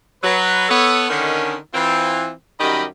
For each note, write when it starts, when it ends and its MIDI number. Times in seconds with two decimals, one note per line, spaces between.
0.23 0.65 54
0.23 0.65 71
0.69 1.09 59
0.69 1.09 69
0.69 1.09 73
1.10 1.56 50
1.10 1.56 51
1.10 1.56 61
1.74 2.31 52
1.74 2.31 60
1.74 2.31 65
2.60 2.84 42
2.60 2.84 51
2.60 2.84 55
2.60 2.84 67
2.60 2.84 75
2.60 2.84 83